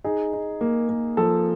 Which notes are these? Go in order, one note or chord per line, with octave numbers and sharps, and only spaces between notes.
D#4 G#4
D#4
A#3
A#3
F3 A4